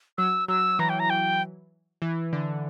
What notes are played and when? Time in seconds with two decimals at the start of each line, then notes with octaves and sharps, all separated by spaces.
0.18 F#3 E6
0.48 F#3 E6
0.79 E3 A#5
0.89 G5
1.00 A#5
1.10 G5
2.02 E3
2.33 D3